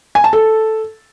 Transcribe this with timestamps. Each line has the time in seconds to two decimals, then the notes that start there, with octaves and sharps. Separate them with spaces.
0.15 G#5
0.24 A5
0.33 A4